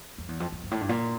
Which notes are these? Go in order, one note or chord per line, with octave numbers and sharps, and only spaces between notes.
F2
E2
F2
F2
G2
A2
G2
A#2